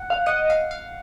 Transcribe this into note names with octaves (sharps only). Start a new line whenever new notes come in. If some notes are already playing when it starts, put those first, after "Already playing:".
Already playing: F#5
F5
D#5 F#5
F5
F5